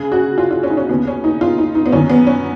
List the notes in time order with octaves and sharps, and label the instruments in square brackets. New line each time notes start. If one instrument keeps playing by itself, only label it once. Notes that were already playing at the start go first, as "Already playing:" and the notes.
Already playing: [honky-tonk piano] C#2 C#3 G#4
F#4
F4
F4
C#4
D#4
C#4
D#2 C#3 B3
C#4
D#4
F4
D#4
D#4
B3
F#2 D#3 C#4
B3
C#4